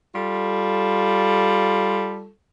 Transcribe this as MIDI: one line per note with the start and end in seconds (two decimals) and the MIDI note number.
0.14 2.29 55
0.14 2.29 65
0.14 2.29 69